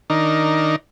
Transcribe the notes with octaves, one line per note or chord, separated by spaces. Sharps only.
D#3 D4 D#4 A#4